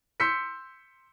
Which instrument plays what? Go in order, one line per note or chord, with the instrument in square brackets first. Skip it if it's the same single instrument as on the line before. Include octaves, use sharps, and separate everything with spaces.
[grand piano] C6 E6 G6 B6 C#7